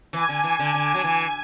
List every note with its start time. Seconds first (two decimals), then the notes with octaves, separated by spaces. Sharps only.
0.13 E3 G#5
0.29 D3
0.44 E3
0.59 D3
0.74 D3
0.95 F#3
1.04 E3